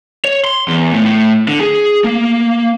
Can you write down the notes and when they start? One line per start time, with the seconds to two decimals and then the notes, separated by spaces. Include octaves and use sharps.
0.25 C#5
0.45 C6
0.68 E2
0.92 A2
1.05 A2
1.48 D3
1.61 G#4
2.04 A#3